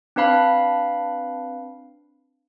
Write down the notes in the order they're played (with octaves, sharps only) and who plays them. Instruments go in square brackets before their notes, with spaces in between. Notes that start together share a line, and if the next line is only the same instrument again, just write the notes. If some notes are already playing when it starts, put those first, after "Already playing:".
[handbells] C4 D4 B4 F5 B5